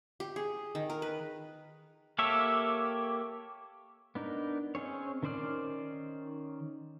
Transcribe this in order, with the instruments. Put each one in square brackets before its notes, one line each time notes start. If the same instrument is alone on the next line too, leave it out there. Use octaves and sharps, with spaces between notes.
[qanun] G4
G#4
D#3
A#4
B4
[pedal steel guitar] A#3 G4 A4 C#5 E5
B3 D4 D#4 A#4
C4 C#4 G#4 C#5
D#3 C#4 C5 D5 F6